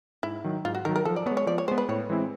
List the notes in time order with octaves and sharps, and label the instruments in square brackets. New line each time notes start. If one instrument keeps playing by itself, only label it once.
[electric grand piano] G#2 [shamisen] E4
[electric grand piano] D#3 F#3
[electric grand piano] G#2 [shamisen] F4
[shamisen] F#4
[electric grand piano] D#3 F#3 [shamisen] A#4
[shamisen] A#4
[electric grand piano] F3 [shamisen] A4
[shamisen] D5
[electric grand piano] B3 [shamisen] C#5
[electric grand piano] G#3
[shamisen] C#5
[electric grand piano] F3 [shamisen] D5
[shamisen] C#5
[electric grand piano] G#3 B3 [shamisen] C5
[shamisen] B4
[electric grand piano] A2 [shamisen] C#5
[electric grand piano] E3 G#3 C4 E4